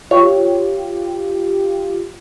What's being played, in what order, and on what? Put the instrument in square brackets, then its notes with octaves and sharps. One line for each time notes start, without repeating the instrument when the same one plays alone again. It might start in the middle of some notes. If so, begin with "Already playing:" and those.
[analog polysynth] F4 G4 [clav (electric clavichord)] C#5